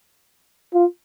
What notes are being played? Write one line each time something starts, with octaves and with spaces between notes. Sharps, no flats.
F4